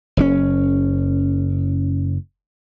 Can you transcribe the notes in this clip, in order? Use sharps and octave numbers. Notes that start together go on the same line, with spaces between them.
F#1 C#3 C#4